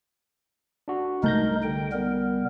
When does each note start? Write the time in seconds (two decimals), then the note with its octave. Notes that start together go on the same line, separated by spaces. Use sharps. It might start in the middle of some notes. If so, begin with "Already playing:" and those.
0.88 D4 F#4
1.24 C2 G#3 A3 D#4 A#4 G6 A#6
1.63 D3 G5
1.93 G3 B3 A#4